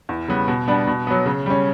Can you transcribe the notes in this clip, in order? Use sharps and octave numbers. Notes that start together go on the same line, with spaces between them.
E2
C#3 G3 B3
B2
G3 B3 D4
B2
F#3 B3
C#3
G3 C#4